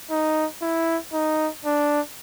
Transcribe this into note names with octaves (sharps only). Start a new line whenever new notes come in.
D#4
E4
D#4
D4